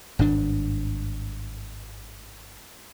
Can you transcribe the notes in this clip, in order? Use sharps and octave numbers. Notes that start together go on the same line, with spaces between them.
G#1 G2 D4